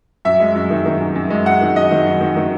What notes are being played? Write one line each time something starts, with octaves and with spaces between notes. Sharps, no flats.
F#2 E5
G#3
F#2
D#3
D#3
F#2
F#2
G#3
F#2 F#5
D#3
F#2 D#5
D#3
F#2
D#3
D#3